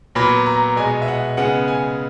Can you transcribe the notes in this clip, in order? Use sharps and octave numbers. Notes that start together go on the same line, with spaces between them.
A#2 F#3 B3 B5
A#5
B2 G#3 B3 G#5
E5
F#5
C#3 G#3 B3 F#5
G#5